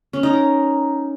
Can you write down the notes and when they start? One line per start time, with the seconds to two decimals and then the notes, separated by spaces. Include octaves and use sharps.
0.13 C#4
0.23 D#4
0.33 A#4